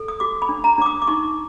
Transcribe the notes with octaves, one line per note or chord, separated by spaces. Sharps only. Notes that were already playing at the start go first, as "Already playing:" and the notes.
Already playing: A4
D#6
F#4 D6
B5
D4
A#5
D4 D6
D#6
D6
D#4 C#6